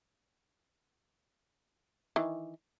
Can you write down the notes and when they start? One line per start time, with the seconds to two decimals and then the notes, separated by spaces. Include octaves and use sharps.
2.16 D#3 E3